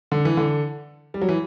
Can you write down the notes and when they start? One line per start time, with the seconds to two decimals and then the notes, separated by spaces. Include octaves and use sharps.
0.12 D3
0.25 E3
0.37 D3
1.14 G3
1.21 F#3
1.29 E3